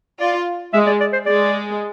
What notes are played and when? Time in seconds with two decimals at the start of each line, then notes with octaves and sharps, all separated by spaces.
0.20 F4 D5
0.73 G#3 E5
0.87 D5
1.00 D5
1.13 C5
1.26 G#3 D5